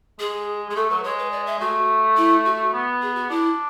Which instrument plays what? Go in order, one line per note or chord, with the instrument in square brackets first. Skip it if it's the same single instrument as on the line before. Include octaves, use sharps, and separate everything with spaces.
[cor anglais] G#3 [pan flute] G#4
[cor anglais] G#3 [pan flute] G#4
[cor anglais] A3 [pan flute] A4
[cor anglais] F#3 [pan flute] B4
[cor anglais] G#3 [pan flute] C#5
[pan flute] B4
D5
E5
[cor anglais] A3 [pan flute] F#4
[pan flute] E4
F#4
[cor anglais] B3
[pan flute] G#4
F#4
[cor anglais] D4 [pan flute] E4